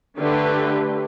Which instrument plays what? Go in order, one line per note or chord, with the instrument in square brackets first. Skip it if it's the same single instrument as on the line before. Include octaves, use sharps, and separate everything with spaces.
[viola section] D3 A3 G4 B4